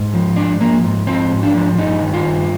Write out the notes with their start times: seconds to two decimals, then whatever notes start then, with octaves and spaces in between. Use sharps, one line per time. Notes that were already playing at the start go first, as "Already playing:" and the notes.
Already playing: G#2
0.14 F3
0.36 G#2 D4
0.61 F3 A#3
0.84 G#2
1.07 F3 C4
1.32 G#2
1.43 D4
1.54 F3
1.78 G2 D#4
2.02 D#3
2.14 F4
2.26 G2